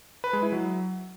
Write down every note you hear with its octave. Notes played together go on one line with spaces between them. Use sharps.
B4
G#3
E4
F#3